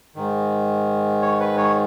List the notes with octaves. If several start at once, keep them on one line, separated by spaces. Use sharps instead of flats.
G#2 D#3
C#5
B4
C#5